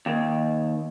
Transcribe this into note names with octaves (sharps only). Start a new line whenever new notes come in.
D#2